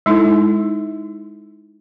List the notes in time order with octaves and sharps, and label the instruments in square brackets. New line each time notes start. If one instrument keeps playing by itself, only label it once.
[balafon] G#3 D#4 E4 A4